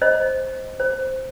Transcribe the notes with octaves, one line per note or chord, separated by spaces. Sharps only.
C5 D#5
C5